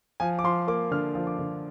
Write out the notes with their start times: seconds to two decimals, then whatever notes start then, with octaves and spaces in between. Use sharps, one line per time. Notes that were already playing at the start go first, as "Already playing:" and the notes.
0.20 F3 G#5
0.39 D6
0.44 F3 C6
0.68 A#3 D6
0.91 D3 F6
1.15 F3
1.27 D6
1.39 D3